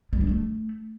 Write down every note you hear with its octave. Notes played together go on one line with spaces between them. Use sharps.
G3
D4
A3